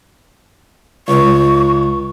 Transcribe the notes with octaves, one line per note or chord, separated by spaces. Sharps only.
C#2 C#6